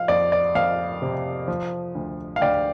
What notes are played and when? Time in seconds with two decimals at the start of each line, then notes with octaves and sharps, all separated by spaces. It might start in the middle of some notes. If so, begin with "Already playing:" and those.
Already playing: F3 F5
0.08 F2 D5
0.32 D5
0.55 F2 F5
1.02 C3
1.48 F3
1.95 D2
2.36 F5
2.41 D2 D5 G5